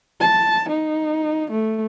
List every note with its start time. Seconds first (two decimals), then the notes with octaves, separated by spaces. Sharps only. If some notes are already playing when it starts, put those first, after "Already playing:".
0.21 A5
0.69 D#4
1.51 A3